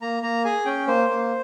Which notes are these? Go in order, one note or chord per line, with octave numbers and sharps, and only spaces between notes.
A#3 A#5
A#3 A#5
G#4 G#5
C#4 G5
A#3 C5
A#3